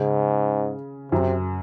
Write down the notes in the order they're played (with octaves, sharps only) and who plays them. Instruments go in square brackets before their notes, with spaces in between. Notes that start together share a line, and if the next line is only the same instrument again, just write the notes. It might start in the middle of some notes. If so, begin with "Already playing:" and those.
Already playing: [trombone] G#2 [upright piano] C#3
[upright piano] F#2 [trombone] C3